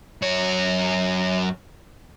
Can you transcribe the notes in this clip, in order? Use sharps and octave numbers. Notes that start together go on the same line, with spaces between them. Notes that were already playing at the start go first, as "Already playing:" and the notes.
F#2 C#5